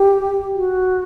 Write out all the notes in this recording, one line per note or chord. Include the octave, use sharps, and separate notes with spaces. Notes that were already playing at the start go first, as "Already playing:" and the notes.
Already playing: G4
F#4